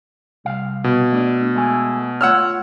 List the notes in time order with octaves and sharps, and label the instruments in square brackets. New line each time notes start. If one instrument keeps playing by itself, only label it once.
[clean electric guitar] C2 F5
[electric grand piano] B2
[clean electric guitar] A3 D4
G#3 A3 G#5
[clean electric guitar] A3 F4 C#5 [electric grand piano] F#5 E6 F6